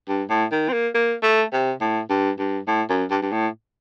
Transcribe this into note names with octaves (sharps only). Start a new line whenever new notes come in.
G2
A2
D#3
C4
A#3
A#3
A3
C3
A2
G2
G2
A2
F#2
G2
G2
A2